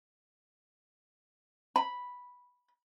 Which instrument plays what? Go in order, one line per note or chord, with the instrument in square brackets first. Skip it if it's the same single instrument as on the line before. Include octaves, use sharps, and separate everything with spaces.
[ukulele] B5